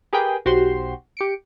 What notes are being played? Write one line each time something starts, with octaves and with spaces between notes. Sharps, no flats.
G4 G#4 A#4 B4 G5
B1 F#4 G4 C5 C6
G4 C#7 D7